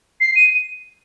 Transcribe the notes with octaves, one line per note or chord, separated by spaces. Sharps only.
C7
D#7